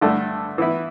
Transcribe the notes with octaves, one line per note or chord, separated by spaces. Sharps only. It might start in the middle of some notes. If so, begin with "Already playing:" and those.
G2 D3 A3 E4 A4
E3 B3 E4